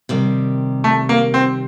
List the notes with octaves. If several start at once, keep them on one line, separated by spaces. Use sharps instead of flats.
C3 D#3 G3
A3
A#3
C4